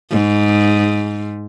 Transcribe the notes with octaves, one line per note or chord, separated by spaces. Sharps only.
G#2